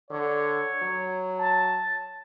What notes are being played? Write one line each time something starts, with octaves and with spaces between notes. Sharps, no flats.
D3 C#5
F#3
A5